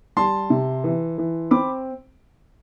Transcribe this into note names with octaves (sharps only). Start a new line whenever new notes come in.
G3 A5 C6
C3
E3
E3
C4 B5 D6